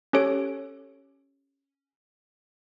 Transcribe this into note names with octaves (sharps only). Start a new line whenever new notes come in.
C#4 G4 A4 C#5 D7